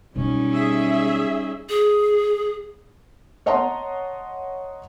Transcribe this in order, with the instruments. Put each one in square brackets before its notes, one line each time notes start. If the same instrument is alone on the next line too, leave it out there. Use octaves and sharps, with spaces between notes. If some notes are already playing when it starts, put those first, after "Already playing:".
[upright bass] B2 F#3 [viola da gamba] G3 C#4 D#4
[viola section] G#4 E5
[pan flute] G#4
[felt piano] C#5 D#5 F#5 A5 A#5 C6